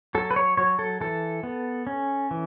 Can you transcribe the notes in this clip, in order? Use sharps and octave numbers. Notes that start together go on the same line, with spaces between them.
F#3 A4
B4
C#5
F#3 C#5
A4
E3 A4
B3
C#4
E3